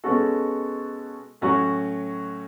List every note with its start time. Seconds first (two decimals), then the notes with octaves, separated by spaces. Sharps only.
0.04 B2 G#3 C#4 F#4 A4
1.41 A2 F#3 C#4 F#4